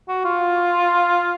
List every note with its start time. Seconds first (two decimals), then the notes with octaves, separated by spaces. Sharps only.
0.09 F#4
0.25 F4